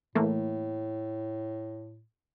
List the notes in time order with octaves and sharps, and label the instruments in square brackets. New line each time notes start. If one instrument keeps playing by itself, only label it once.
[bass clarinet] A2 [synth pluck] E3 A3 A#3